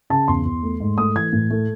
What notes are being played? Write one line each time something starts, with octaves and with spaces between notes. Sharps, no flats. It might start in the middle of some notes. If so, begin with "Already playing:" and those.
C#3 A5
E2 C6
E2
A3
G#2
A3 D#6
E3 G#6
A2
A3